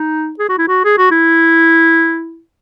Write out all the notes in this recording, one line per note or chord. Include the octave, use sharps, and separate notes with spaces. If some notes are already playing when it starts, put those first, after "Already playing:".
Already playing: D#4
G#4
F#4
E4
F#4
G#4
F#4
E4